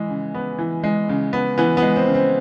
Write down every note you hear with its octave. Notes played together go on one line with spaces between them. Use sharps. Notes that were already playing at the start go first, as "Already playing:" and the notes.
Already playing: E3 G#3
C#3
B3
E3
G#3
C#3
B3
E3 B3
B3
G#3
C4
C#3
C4